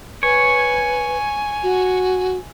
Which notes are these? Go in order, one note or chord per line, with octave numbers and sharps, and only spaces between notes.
B4 C#5 G#5
F#4